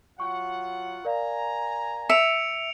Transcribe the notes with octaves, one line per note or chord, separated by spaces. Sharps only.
F#3 F4 F#5 C#6
A#4 D5 F5 G#5 A#5
E5 C#7 D7 F7